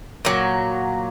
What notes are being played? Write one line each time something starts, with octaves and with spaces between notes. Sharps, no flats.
A#2 F#3